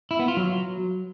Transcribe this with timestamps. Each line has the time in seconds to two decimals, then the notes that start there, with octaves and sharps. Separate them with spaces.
0.11 E4
0.19 B3
0.28 F4
0.37 F#3